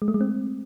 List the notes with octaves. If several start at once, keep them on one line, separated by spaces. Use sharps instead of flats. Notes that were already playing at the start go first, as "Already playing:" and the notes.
G#3
A3
G#3
C4